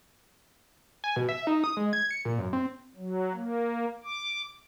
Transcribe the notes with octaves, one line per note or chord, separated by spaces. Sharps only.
G#5
B2
E5
D#4
D#6
G#3
G#6
C#7
A#2
F#2
C4
F#3
A#3
D6